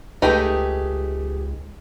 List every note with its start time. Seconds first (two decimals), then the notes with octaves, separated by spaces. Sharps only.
0.22 C#2 A3 D#4 G4 G#4 B4 G5